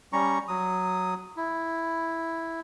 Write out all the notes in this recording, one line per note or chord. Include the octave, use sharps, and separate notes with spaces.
G3 C#4 A#5 C#6
F#3 D#6
E4